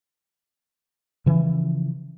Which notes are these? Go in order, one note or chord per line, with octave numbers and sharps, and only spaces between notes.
C#3 E3 F3